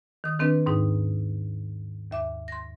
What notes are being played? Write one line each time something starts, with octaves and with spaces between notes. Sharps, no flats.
D#3 D#6
D#3 C4 D4 B4
D#2 G#2 D#4
D#2 E5 D6
C6 A#6